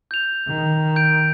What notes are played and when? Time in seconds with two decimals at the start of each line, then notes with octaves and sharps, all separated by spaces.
0.11 G6 F7
0.48 D#3
0.96 G6 D7